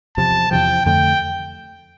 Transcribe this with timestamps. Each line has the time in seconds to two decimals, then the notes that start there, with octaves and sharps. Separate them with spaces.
0.17 E2 C3 F3 A5
0.51 E2 C3 F3 G5
0.85 F2 D3 A3 G5